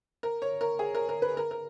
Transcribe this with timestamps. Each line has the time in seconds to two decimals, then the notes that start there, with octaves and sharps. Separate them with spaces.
0.23 A#4
0.42 C#5
0.61 A#4
0.79 G#4
0.95 A#4
1.09 A#4
1.22 B4
1.37 A#4
1.51 A#4